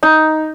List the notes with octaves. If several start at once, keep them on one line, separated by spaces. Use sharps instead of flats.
D#4